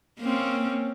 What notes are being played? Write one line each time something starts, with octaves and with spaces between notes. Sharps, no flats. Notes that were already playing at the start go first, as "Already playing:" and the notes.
A#3 C4 C#4